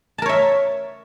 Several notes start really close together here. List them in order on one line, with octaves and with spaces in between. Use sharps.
A5 A#4 C#5 E5